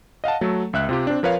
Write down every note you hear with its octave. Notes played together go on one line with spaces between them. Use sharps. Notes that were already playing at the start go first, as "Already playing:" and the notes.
D#5 F5 F#5 A5
F#3 A3 A4
C#2 E5 F#6
C3 F4 G4
C4 D4
F3 A#4 B4 C#5 F5